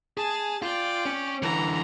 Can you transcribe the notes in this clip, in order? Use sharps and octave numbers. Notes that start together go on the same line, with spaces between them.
G#4 G#5 A5
F4 D5 G5
C#4
D3 E3 A#5